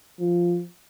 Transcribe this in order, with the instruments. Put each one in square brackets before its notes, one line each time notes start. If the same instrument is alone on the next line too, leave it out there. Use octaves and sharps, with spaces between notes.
[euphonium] F3